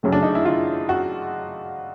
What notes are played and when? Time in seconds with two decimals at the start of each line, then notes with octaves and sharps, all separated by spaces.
0.03 F#2 C#3 F#3 A3
0.12 D4
0.23 D#4
0.35 E4
0.45 F4
0.89 F#4